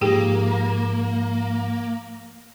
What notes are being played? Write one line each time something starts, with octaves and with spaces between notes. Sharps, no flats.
G#2 F3 A#3 G4 G#4 G5